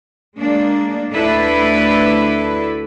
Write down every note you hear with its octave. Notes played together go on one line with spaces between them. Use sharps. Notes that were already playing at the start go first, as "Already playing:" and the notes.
G#3 A#3 D4
D2 D4 E4 A4 B4